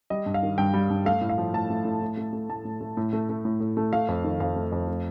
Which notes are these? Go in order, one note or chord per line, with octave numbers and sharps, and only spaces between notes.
G3 D#5
G2
F5
D#3
G2 G5
G3
G2
A3 F5
A2
F5
F3
A2 A5
A3
A2
A2
A3
A3
A2 A5
A2
A3
A2
A3
A3
A2
A2
A3
A3 F5
F2
D#3
F2 F5
A3
F2
A3